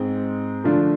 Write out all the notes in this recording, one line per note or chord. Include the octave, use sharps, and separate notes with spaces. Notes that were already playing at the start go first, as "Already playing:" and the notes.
Already playing: G#2 G#3 C4
D3 F3 A3 D4 F4